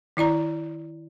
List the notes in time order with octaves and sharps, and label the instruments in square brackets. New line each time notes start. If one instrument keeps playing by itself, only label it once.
[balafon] D#3 E4 D5 A#5